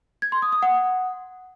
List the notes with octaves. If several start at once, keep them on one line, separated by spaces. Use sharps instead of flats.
G#6
C6
D#6
D#6
F#5